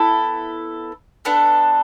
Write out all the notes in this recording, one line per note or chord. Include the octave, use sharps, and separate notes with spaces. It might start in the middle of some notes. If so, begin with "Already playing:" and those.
Already playing: B3 E4 A4
B3 D4 A4 F#5